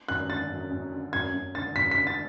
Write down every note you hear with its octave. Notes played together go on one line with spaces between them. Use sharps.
F#2 F#6
D3 A6
F#2
F#2
D3
F#2 G#6
F#2
D3 A6
F#2 B6
B6
D3
A6